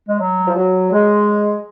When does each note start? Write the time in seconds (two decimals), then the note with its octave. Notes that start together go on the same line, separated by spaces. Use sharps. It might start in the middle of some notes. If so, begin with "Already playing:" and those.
0.08 G#3
0.20 F#3
0.47 F3
0.56 F#3
0.92 G#3